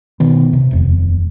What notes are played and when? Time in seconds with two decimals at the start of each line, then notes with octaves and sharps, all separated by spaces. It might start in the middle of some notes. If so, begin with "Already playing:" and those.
0.20 B2 D#3 B3
0.53 C3
0.71 D#1 F2